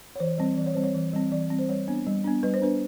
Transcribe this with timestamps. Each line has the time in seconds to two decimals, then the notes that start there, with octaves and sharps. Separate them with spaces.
0.15 C#5
0.20 E3 C5
0.38 G3 C4
0.57 E3 D5
0.66 C#5
0.74 G3 C4 C5
0.84 C#5
0.94 E3
1.13 G3 C4
1.32 E3 D5
1.50 G3 C4
1.59 C5
1.69 G3 C#5
1.88 B3 D4
2.07 G3
2.24 B3 D4
2.43 G3 B4
2.54 C5
2.62 B3 D4 B4